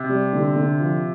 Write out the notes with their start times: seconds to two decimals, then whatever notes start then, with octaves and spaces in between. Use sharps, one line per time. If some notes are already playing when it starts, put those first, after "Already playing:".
Already playing: C3
0.09 G3
0.33 D3
0.56 D3
0.80 F3